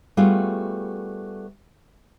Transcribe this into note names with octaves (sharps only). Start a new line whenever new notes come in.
G3 A3 B3 F4 F#4 G#4